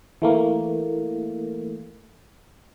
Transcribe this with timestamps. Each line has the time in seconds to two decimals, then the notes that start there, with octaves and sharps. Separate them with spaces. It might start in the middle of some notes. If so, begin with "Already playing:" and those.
0.22 E3 A3 A#3